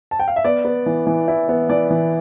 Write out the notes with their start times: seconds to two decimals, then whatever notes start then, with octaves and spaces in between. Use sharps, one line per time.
0.11 A5
0.19 G5
0.28 F5
0.36 E5
0.44 B3 D5
0.65 B3
0.86 E3
1.07 E3
1.28 E4
1.49 B3
1.69 E3 D5
1.91 E3